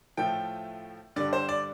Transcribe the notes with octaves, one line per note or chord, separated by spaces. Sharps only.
A2 F3 A3 G5
G2 D3 G3 D5
C5
D5